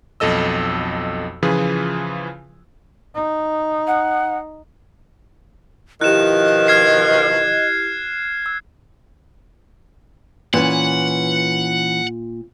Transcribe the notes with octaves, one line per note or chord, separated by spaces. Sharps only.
B1 F2 A4 D#5 E6
C#3 E3 F3 F4 G#4 B4
D#4
F#5
B2 D#3 F3 E4 G4 D#5 F#6 E7
F6 G#6 C7
E6
A#2 E3 C#4 F#5